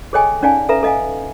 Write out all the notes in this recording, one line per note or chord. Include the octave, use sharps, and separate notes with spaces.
G#4 A4 C#5 D#5 G5 G#5
C#4 D#4 D5 F5 G5 G#5
A4 B4 E5 A#5
A4 D#5 F5 G#5